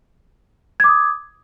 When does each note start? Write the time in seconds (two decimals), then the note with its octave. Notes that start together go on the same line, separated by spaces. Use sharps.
0.80 G#6
0.84 D6
0.88 D#6